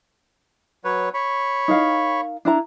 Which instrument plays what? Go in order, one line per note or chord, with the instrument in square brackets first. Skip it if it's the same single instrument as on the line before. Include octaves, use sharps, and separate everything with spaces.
[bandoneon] F#3 B4 C#5
C#5 B5 C#6
[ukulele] D#4 A#4 F5
D4 E4 A#5